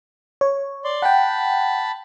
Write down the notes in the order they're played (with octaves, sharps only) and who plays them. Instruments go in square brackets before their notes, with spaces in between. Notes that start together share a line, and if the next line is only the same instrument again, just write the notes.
[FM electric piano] C#5
[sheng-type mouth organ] D5 C6
[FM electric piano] F#5 G5 [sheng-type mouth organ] A5 B5